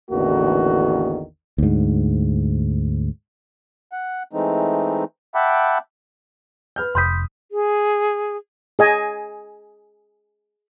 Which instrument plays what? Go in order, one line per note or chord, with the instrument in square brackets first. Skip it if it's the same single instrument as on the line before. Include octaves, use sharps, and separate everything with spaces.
[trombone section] A1 E2 D3 D#3 A#3 F#4
[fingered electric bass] D2 G#2
[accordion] F#5
E3 G#3 A3 C4 D#4
E5 F#5 G5 A5 B5 D6
[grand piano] B4 F6 G6
[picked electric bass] F1 [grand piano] B5 D#6 [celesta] C6 G6 B6
[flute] G#4
[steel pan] G#4 D#5 G#5